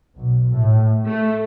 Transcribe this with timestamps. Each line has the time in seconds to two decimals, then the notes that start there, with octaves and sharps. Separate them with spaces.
0.17 B1
0.50 A2
1.06 A3